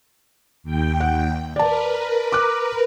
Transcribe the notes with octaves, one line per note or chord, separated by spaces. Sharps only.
D#2 G5
F#5
A#4 B4 D5 A5
D6 F#6